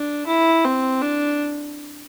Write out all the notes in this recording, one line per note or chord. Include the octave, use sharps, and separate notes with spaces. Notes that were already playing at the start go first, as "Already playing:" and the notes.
Already playing: D4
E4
C4
D4